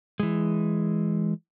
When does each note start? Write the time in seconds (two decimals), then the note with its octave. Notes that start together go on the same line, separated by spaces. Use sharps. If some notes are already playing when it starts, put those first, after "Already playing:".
0.20 E3 G#3